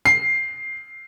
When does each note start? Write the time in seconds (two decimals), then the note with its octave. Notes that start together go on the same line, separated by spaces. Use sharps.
0.06 C7